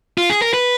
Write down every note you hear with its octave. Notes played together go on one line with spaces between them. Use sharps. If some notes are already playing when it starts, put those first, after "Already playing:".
F4
G#4
A#4
B4